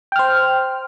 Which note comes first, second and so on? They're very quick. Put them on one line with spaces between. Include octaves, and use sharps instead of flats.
G5 F6 C5